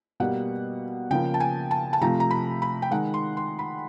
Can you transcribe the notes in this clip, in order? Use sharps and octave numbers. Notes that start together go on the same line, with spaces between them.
B2 G3 A#3 F#5
C#3 F3 A#3 G5
A5
G#5
A5
A5
C3 F3 A3 A#5
A#5
B5
B5
G5
D#3 G#3 F#5
C6
C6
B5